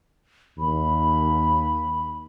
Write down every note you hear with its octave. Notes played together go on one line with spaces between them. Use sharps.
D#2 B5